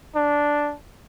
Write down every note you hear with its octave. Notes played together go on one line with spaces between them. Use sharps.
D4